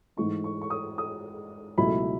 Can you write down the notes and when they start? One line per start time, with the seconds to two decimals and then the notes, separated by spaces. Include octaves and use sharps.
0.17 G#2 E3 A3 D#4 C#6
0.44 C#6
0.62 C#6
0.70 D#6
0.98 D#6
1.77 C#2 B2 F#3 A3 E4 B5